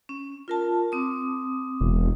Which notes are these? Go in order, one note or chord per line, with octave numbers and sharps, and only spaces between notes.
C#4
F4 A#4 A5
C4 D6 D#6
E1